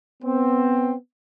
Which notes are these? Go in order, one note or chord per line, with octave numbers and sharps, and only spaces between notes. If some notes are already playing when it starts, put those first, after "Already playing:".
B3 C4